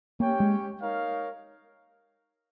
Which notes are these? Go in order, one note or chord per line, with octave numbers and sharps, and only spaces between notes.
A#3 C#4 G4 C#5 G5
G#3
D#4 A#4 C#5 F5